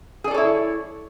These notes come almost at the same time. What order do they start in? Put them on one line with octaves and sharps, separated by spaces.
G#4 D5 A4 C#5 E4